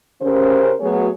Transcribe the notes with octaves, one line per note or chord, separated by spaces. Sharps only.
C#3 C#4 G4 A#4 C5
F#3 A3 B3 F#4 G#4 C#5